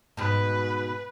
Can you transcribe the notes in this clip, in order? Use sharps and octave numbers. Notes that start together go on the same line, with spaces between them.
G#2 B2 B4